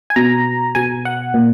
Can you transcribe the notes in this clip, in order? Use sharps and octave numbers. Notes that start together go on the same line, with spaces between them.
G#5
B2 A#5
B2 G#5
F#5
A#2